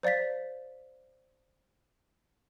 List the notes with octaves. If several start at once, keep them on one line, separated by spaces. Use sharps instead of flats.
C5 D5 F5 A6 B6